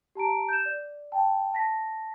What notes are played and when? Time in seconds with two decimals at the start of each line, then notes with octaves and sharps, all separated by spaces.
0.15 G4 A5 A#5 D7
0.49 G6 E7
0.65 D5
1.12 G5 A5
1.53 A5 A#6 B6